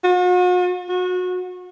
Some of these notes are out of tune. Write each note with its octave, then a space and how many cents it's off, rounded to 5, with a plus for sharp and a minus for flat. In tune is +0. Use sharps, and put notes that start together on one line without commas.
F#4 -45
F#4 -30